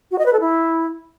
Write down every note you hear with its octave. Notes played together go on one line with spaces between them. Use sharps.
F#4
D#5
B4
A4
E4